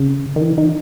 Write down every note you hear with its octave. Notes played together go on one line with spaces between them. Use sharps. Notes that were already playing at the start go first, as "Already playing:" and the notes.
Already playing: C#3
D#3
E3
D#4